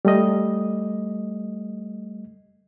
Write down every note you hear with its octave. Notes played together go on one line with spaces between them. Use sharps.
G3 A3 D#5